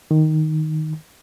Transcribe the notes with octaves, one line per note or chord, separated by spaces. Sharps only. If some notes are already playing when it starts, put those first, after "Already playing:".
D#3